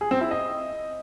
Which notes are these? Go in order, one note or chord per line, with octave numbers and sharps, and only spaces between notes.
G#4
C4
E4
D#5